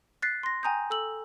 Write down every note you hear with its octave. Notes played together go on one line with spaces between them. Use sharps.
F#6 A6 B6 C7
C6 A#6
G5 G#5 A#5 D#6 G6
A4 E6 F#7